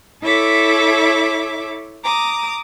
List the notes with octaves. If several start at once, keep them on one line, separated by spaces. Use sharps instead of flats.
E4 A4 C#5 E5 D6
A#5 D6 D#6